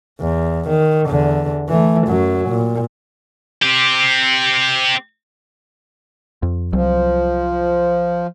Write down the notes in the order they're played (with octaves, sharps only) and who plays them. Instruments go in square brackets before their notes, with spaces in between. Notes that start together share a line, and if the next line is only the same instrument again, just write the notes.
[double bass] E2
D#3
E2 D3
E3 A3
F#2 F#3
A#2
[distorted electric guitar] C4 G4
[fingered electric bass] F2
[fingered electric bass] C2 F#3 [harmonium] F3